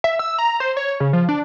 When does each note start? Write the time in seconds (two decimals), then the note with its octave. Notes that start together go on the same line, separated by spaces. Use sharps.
0.04 E5
0.19 E6
0.39 A#5
0.60 C5
0.77 C#5
1.00 C#3
1.13 F3
1.29 D4